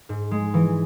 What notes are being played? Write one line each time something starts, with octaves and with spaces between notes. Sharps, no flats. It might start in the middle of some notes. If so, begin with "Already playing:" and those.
G#2
G#3
E3